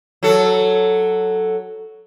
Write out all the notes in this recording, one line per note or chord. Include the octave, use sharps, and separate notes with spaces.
F#3 A4